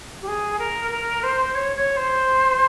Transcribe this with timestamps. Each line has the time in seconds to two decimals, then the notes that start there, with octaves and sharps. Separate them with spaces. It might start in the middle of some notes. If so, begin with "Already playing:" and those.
0.22 G4
0.27 G#4
0.58 A#4
0.91 A#4
1.23 C5
1.54 C#5
1.76 C#5
1.96 C5